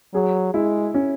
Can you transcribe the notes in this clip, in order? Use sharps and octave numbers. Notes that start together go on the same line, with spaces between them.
F#3 G#4
G#3 E4
C#4